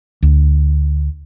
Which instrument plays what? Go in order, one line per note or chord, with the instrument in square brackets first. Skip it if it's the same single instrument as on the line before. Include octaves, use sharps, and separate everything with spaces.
[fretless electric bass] D2